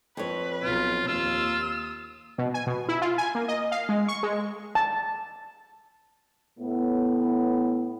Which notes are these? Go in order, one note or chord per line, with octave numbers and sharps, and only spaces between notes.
F2 B4 C#5
B1 F4
D#2 F4 E6
B2
G#5
B2
E4
F4
G#5
A#3
D#5
F5
G#3
C#6
G#3
A5
A2 B3